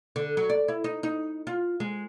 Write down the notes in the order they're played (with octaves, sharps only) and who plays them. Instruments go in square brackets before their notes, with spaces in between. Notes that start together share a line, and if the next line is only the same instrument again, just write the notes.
[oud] D3
F#3
D5
E4
D#4
D#4
F4
G#3